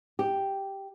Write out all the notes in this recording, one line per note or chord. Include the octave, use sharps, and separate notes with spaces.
G4